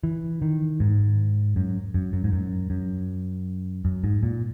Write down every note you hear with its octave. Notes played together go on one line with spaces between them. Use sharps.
E3
D#3
G#2
F#2
F#2
F#2
G#2
F#2
F#2
F#2
G#2
A#2